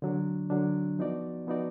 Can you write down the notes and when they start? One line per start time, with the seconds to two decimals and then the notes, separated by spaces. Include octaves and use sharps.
0.02 D3 F#3 D4
0.50 D3 F#3 D4
0.99 F3 B3 D#4 F#4 D5
1.47 F3 B3 D#4 F#4 D5